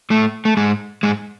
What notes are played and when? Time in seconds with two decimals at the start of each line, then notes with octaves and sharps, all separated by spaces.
0.10 A2 A3
0.45 A3
0.57 G#2 G#3
1.03 G#2 G#3